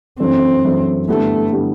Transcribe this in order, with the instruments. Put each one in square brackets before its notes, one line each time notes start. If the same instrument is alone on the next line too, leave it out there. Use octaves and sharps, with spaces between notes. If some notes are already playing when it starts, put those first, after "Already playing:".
[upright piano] F#2 E3 A3 D4 [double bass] C4
[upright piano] F#2 E3 A3 D4
[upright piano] G2 D3 G3 B3 E4 [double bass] A3
[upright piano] D3 G3 B3 E4